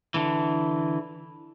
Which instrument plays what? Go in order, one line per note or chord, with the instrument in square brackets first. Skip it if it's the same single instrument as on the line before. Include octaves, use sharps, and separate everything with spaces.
[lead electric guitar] D3 E3